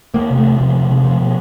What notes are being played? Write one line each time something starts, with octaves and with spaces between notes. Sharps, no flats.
E2 A#3
C3
A3
E2
C3 F3
E2
C3
E2 F3
B2